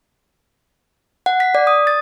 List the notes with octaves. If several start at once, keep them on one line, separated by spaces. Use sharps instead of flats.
F#5
B6
D5
D#6
A6